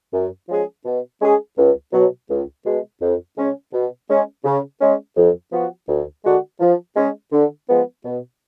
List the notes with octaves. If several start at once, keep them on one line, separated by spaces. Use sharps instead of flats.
F#2
F3 G#3 C#4 G#4
B2
G#3 C#4 G#4
C#2
B2 F#3
C#2
B2 G#3
F2
C#3 G#3 C#4
B2
G#3 C#4
C#3
G#3 C#4
F2
F3 B3 F#4
D2
D3 G#3 D4 F#4
F3
G#3 C#4
D3
F3 G#3 B3
B2